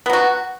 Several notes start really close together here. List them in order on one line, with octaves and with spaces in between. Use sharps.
B3 F#3 F#4